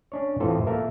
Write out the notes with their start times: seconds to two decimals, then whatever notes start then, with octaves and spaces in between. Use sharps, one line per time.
0.12 C#4 D4 C#5
0.40 A2 E3 C4 F4 A4
0.66 A3 A#3 A#4 E5